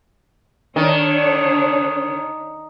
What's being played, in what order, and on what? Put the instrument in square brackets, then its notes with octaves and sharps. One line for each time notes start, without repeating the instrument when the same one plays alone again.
[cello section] D3 D4 C#5 [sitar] D#3